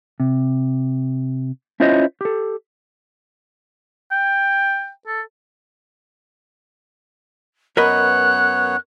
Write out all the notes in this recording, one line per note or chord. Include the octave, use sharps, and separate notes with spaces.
C3
C#4 E4 F4 C5 C#5 D#5
G4 A4
G5
A4
F#2 B3 A#4 B4 C#5 D#5 F#6